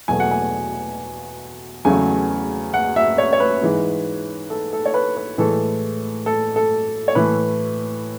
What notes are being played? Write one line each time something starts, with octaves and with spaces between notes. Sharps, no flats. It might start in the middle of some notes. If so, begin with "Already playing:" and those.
E2 B2 F#3 A3 G#5
F#5
G#5
E2 C#3 F#3 A3 G#5
F#5
E5
C#5
C#5
B4
G#2 E3 G#3
A4
A4
C#5
B4
B4
A2 E3 G#3 A4
A4
A4
C#5
A2 E3 A3 B4